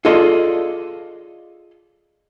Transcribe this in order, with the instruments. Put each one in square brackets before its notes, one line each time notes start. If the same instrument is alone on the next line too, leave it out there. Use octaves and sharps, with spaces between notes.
[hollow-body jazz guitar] F4 G#4 A4 D5 D#5 C6